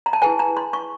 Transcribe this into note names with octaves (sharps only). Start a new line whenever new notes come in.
A#5
A5
E4 G#4 B4 G#5
A#5
C6
C#6